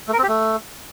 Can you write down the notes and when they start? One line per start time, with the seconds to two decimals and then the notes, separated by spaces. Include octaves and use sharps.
0.08 A3
0.13 A#4
0.18 C4
0.23 G4
0.28 A3